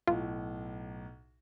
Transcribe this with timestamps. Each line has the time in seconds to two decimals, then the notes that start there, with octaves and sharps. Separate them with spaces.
0.07 B1 A2 F4